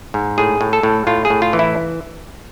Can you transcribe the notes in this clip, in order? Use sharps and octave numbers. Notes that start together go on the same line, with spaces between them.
G#2
A2 G#4
A2
A4
A2
A2 F4
G#4
A2
F4
E3
E4